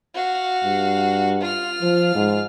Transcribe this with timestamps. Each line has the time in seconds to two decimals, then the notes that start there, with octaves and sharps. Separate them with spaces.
0.14 F#4 F5
0.64 G2
1.41 F4 F6
1.82 F3
2.15 G#2